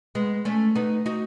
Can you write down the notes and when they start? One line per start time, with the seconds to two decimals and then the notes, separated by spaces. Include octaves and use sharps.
0.15 G#3 B3
0.45 A3 C#4
0.75 B3 D#4
1.06 D#4 F#4